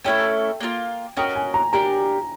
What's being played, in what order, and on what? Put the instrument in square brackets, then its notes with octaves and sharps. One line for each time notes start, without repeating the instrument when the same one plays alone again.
[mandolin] A3 C#4 E4 A4 [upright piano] G5
[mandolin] A#3 D4 F4
[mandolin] C#4 F#4 A#4 D#5 [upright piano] G5
[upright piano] G#5
A#5
[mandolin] D4 G4 A#4 [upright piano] A#5